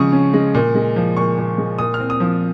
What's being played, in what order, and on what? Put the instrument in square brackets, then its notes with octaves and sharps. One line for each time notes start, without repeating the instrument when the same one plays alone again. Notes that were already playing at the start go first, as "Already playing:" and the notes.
Already playing: [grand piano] C#3 F3 G#3 C#6 D#6
C#4
G#3
A#2
G#3
F3
A#2 C#6
A#2
G#3
A#2 D#6
F6
C4
D#6
F3